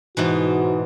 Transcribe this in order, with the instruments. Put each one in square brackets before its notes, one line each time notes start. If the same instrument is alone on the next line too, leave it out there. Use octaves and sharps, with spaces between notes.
[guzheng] G#2 B2 E3 [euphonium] F#4